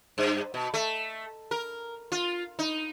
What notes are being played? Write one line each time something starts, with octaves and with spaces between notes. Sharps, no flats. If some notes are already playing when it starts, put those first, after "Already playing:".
G2
B2
A3
A#4
F4
D#4